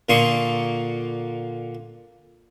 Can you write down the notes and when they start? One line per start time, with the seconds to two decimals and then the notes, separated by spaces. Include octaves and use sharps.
0.09 A#2 D3 A#3 C6 C#6 D#6